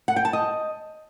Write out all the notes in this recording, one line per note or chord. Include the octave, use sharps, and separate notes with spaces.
F#5
G5
A5
D#5